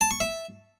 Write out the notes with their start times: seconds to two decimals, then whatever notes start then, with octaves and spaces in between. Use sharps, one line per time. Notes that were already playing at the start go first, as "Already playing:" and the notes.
0.01 A5
0.11 C#6
0.20 E5